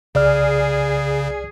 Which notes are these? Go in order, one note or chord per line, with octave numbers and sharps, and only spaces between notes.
C2 C#3 G#4 D5 F6